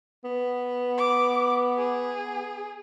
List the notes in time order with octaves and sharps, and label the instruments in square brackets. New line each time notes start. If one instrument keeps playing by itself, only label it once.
[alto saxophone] B3
[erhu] D6
G#4